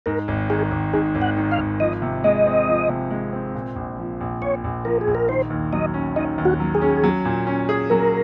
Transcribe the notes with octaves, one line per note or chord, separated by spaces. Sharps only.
G#2 A#4
G#1
D#3 G#4
G#1
G#2 G#4
G#1
F#5
D#3
F5
G#1
F3 D#5
C3
G#3 D#5
C4
F3
C3
G#3
C4
A#2
A#1
F3
A#1
A#2 C#5
A#1
F3 A#4
G#4
A#1
A#4
D#3 C5
D#2
F#3 D#5
C#4
D#3 D#5
D#2
F#4
F#3
G#4
C#4
F#3
A#2
C#4
G#4
F#3 A#4